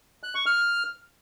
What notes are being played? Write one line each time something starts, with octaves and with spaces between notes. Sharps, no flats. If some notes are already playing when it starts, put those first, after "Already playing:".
F#6
C#6
F6